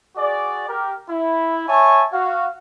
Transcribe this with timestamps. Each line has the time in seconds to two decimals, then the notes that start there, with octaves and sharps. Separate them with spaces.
0.16 F#4 G#4 D5
0.68 G4 A#4
1.10 E4
1.69 C#5 E5 G#5 A5 C#6
2.13 F#4 F5